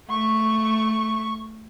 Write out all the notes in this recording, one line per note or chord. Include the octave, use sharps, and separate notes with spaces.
A3 C#6